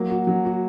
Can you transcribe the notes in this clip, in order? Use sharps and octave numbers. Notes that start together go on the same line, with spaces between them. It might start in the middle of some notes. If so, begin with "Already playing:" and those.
Already playing: F#3 A#3
F#4
F#3
F#4